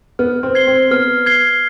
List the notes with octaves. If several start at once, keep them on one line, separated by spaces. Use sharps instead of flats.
B3 F6
C4
G#6 C7 G7
C4
B3 F6
G#6 C7 G7